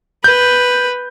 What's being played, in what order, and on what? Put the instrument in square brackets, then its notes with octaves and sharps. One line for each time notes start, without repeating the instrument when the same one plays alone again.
[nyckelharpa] B4 [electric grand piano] G6